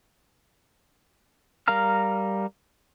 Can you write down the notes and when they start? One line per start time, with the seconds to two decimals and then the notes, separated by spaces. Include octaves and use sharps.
1.68 G3 A#4 F5 A#5 F6